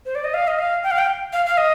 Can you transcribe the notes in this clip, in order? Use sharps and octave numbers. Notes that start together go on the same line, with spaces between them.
C5
D5
D#5
F5
D#5
F5
G5
F5
G5
F5
F5
D#5